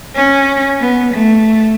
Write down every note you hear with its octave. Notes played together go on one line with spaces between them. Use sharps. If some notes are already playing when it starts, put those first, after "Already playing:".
C#4
B3
A3